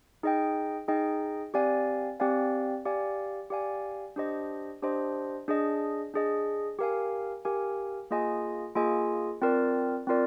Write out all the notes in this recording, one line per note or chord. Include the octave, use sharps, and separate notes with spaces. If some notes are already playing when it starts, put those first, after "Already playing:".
D#4 G#4 D#5 G5
D#4 G#4 D#5 G5
C4 G4 D5 F5 G#5
C4 G4 D5 F5 G#5
G4 D5 F5 G#5
G4 D5 F5 G#5
D4 G4 C5 D#5
D4 G4 C5 D#5
D4 G#4 D#5
D4 G#4 D#5
G4 A#4 F5 G#5
G4 A#4 F5 G#5
A#3 F4 G#4 D#5 G#5
A#3 F4 G#4 D#5 G#5
C4 F4 A#4 D5
C4 F4 A#4 D5